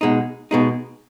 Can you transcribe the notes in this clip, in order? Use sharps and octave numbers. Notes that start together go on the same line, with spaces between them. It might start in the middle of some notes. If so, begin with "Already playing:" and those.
B2 G#3 D#4
B2 G#3 D#4